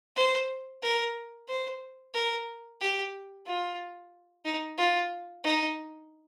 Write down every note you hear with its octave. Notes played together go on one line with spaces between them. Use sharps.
C5
A#4
C5
A#4
G4
F4
D#4
F4
D#4